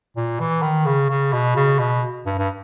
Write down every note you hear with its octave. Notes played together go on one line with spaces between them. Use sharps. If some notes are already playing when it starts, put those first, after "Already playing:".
A#2
E3
D#3
C#3
C#3
B2
C#3
B2
G2
G2